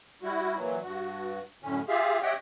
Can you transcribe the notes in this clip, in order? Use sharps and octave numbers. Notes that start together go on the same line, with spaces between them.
G3 E4 F#4
A#2 E3 F#3
G2 F#4
F#2 A2 D3 C#4
F4 G4 G#4 E5 F5
G4 C#5 D#5 E5 F#5 G5